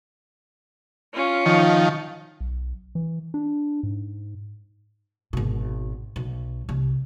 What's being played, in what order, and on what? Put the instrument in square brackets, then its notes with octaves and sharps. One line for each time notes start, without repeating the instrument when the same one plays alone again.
[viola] C#4 F4
[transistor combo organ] D#3 F3
[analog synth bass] B1
E3
D4
G#2
[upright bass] G#1 B2
B1
C2